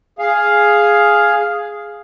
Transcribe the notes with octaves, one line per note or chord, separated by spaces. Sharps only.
G#4 F5